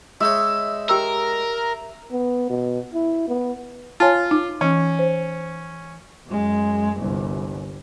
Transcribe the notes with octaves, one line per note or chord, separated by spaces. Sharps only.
G#3 D#4 C#5 E5
G4 A#4 G5 E6
B3
B2
E4
B3
F4 C#5 G#5 A5
D#4
E3 C#4
C5
F#2 G#3
G1 C2